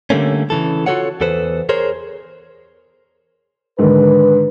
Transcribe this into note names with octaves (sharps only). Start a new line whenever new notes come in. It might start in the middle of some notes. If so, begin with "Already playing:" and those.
D3 G3 A3 A#3 C#4
C#3 E3 A4
F4 F#4 A4 C#5 F#5
E2 A4 B4 C5
G#4 A#4 C5 C#5
G#2 D3 D#3 B4